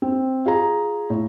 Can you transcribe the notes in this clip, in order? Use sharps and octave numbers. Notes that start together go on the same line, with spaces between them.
C4
F4 G#4 A#5
A2